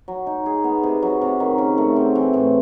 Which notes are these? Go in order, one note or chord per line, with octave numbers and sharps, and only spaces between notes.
F#3
D#4
G#4
B3
C3
F#3
C3
D#3
C#3
A3
C4
E3
A2